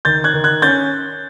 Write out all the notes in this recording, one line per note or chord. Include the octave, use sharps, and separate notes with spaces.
D#3 G6 A6
F#6 G#6
D#3
F#6 G#6
C#4 G6 A6